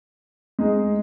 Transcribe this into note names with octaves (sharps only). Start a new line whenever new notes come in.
G#3 D#4 G#4